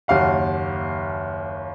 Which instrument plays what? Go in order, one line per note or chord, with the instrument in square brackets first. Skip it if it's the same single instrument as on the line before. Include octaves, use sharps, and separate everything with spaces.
[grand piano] F#1 D#2 F5 F#5